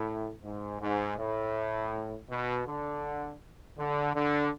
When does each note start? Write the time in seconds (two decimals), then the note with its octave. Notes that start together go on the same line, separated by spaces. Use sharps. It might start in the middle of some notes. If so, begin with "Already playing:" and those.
Already playing: A2
0.43 G#2
0.81 G#2
1.18 A2
2.30 B2
2.66 D3
3.78 D3
4.15 D3